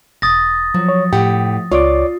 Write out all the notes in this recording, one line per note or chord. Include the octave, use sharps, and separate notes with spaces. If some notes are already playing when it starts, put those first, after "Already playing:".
E1 D#6 A6 A#6
F3 F#3
C#5
A2 G4 F#5 G5
C#2 F4 C#5 D5 D6